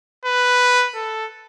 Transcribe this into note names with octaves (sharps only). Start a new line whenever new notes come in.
B4
A4